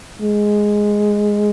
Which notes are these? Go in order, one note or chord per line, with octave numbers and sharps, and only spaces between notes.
G#3